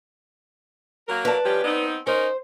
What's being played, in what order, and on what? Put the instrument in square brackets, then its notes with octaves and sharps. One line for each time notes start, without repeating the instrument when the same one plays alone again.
[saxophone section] F#3 A#3 A#4
[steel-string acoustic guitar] B4 D5 A5
[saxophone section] F3 C#4 G4
B3 C4 D#4
[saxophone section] C#4 D#4 A#4 [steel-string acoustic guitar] C5